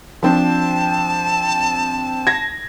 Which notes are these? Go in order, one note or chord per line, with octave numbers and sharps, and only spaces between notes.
F3 C4 D4 A5
G#6 A#6